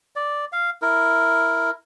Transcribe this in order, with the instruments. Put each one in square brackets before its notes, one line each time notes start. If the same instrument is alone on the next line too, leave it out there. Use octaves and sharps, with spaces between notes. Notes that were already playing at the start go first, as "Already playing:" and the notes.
[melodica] D5
F5
E4 A#4